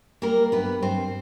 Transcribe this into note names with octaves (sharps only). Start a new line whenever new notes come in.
G3 A#3 A#4
G2 B3 B4
G2 C4 C5